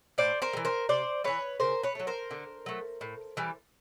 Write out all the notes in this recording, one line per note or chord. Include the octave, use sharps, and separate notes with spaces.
A2 C5 D5
A#4 C5
G3
E3
A#4 C5
C3 C5 D5
E3 G3 B4 C#5
C#3 A#4 C5
B4 C#5
F#3 A3
A#4 C5
D3
F#3 A3
A2
E3 G3